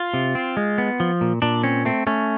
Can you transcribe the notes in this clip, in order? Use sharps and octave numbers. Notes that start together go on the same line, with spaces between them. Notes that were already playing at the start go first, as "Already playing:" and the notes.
Already playing: F4
C3
C4
G#3
B3
F3
A#2
A#2 D4
C4 C#4
A3 C4
A3 C#4